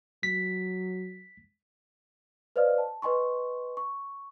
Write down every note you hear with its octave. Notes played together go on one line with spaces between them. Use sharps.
F#3 B6
B4 C5 D5 D#5 F5 F6
A5
B4 D#5 G#5 C6 C#6
C#6